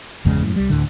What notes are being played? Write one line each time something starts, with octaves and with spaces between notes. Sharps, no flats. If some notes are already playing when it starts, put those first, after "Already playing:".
G1 E2 C#3 G#3
F#2 A2
C2 G3
D2 A2 D3